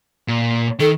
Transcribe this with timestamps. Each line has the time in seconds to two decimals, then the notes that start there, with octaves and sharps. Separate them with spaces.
0.28 A#2
0.80 D#3 A4